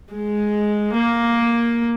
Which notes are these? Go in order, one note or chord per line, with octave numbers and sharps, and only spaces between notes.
G#3
A#3